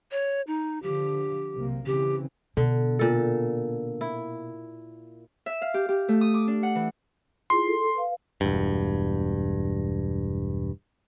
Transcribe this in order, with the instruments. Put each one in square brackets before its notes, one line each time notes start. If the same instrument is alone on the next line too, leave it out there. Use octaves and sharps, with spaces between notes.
[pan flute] C#5
D#4
[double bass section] D3 F3 [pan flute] G4
[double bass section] B1 C3 A#3
[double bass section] C#3 E3 C4 [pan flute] G4
[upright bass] B2 [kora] D3
[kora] A#2 A4
E4
[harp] E5
F5
G4
G4
A3
D#6
D6
D4
F#5
E3
[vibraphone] E4 F4 G#4 [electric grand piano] C6
[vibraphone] A4
B4 F5
[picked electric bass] E1 G2